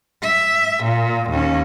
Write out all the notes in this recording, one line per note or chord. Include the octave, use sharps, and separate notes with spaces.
E5
A#2
D#2 C#4